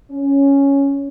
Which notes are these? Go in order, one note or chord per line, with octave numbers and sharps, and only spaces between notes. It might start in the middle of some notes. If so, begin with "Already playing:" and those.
C#4